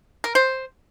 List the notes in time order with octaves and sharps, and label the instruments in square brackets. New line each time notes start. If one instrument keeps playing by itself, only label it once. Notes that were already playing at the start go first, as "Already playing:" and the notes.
[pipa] A#4
C5